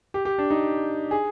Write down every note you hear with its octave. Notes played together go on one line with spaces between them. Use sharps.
G4
G4
D4
D#4
G#4